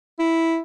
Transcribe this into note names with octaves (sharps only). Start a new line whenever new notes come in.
E4